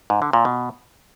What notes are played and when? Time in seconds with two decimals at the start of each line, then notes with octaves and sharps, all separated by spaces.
0.10 G#2
0.22 D3
0.33 A#2
0.45 B2